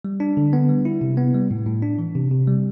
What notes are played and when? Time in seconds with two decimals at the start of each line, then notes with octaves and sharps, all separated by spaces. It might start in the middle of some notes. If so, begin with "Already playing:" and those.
0.05 G3
0.20 D4
0.37 D3
0.53 B3
0.69 G3
0.85 E4
1.01 C3
1.17 B3
1.34 G3
1.51 A2
1.66 A2
1.83 D4
1.99 E3
2.15 C3
2.31 C3
2.47 G3